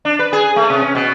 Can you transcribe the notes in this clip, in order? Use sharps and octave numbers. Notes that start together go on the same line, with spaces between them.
D4
B4
G#4
A3
C3
C#4
B2